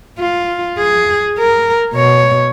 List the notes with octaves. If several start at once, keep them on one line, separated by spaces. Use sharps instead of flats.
F4
G#4
A#4
B2 C#5